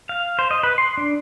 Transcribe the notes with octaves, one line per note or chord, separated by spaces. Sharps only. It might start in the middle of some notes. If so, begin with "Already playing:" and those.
F5
C5
D#5
B4
C6
D4